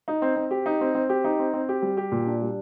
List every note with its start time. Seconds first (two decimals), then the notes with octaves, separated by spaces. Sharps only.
0.08 D#4
0.22 C4
0.36 C4
0.51 G4
0.66 D#4
0.81 C4
0.95 C4
1.09 G4
1.24 D#4
1.39 C4
1.53 C4
1.69 G4
1.82 G3
1.97 G4
2.12 A#2
2.27 D4
2.42 G3